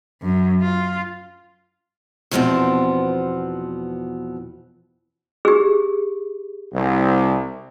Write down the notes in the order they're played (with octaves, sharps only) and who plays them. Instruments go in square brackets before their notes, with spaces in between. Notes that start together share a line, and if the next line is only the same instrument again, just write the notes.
[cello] F#2
F4
[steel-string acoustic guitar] E2 B2 F3 G3 B3 C4
[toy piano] G4 G#4
[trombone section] C2